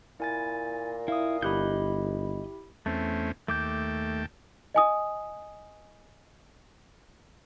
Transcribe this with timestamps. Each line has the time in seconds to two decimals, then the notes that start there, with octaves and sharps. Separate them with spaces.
0.20 A#2 E4 G#5 A6
1.08 E4 F5 D#6
1.42 G1 E4 G4 D#5 B5 F#6 G6
2.86 E2 A3 C4 C#4
3.48 D#2 A3 G5 A5 D6 G6
4.75 D#5 G#5 D#6